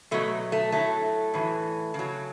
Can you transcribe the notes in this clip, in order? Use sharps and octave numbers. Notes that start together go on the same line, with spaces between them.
B2 F#3 A3
A3
A2 F#3 A3
A2 E3
C#3 F#3